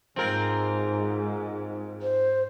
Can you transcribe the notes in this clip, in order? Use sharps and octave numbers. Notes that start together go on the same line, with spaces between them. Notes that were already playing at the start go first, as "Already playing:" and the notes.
G#2 C4 F4 A#4
C5